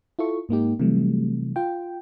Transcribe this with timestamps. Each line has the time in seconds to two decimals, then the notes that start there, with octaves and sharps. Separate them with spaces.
0.19 E4 F4 A4 C#6
0.49 G#2 A#3 D#4 G4
0.79 C3 E3 F#3 G3 A3
1.56 F4 G5